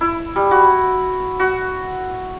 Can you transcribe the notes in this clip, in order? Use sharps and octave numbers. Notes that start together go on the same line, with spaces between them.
E4
G3
F#4
F#4